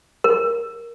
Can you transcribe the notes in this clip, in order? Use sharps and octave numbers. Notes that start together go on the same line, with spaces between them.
A#4